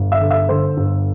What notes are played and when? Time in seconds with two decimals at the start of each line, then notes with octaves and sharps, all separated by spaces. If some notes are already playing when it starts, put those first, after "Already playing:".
Already playing: G1
0.12 E5 E6
0.20 D3
0.31 E5 E6
0.49 D3 C5 C6
0.77 G1